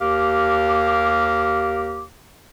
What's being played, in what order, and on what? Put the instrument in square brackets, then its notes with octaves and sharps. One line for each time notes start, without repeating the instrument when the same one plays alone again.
[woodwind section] D#2 G4 A#4 F5 D6